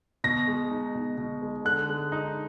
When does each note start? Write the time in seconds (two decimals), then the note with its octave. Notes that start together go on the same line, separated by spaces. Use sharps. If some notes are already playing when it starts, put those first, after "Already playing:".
0.24 B2 A#6
0.47 G#3
0.71 D#4
0.95 B2
1.17 B2
1.42 G#3
1.65 D3 F#6
1.88 G#3
2.12 D#4